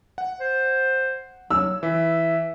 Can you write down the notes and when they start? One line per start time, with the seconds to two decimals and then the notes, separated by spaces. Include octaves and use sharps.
0.18 F#5
0.41 C5
1.51 F#3 E6
1.83 E3 E5